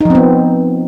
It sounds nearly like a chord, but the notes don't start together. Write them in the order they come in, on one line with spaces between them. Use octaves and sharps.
D#4 F3 C4 B3